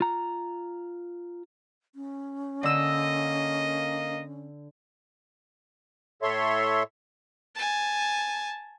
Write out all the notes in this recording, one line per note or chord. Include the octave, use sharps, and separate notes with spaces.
F4 A#5
C#4
D3 A#3 D#5 E6
A2 A4 C#5 E5 C6
G#5 A5